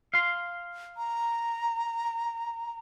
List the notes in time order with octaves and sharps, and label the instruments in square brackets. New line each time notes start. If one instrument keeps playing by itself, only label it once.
[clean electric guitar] F5 C6
[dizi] A#5